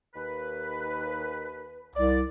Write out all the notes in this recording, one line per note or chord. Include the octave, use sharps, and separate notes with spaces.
D#2 B4
C2 D5